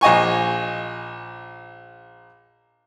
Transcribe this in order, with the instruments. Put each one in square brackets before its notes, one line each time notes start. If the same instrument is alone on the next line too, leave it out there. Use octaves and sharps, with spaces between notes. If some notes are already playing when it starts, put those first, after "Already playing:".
[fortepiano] A#1 D#5 G#5 C#6